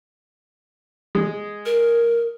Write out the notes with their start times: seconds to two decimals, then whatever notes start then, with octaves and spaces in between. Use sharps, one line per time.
1.15 G#3
1.66 A#4